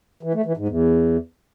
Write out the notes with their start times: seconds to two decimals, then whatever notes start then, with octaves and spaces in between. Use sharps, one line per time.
0.23 E3
0.34 A3
0.46 E3
0.57 G#2
0.68 E2